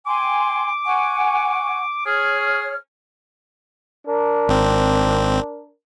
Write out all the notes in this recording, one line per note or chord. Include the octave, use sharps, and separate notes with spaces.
G5 G#5 C6 D6
F#5 G#5 C#6
G#4 C#5 F6
D4 A#4
G#1 C4